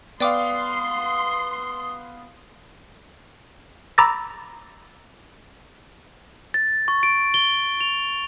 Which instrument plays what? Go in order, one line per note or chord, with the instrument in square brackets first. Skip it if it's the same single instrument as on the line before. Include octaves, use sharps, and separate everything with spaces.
[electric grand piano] B3 F5 [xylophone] D5 G5 D6 [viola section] C6 [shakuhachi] D#6
[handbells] A#5 B5 D6 E6 A6 A#6
[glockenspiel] A6
C#6
D7
G7
F7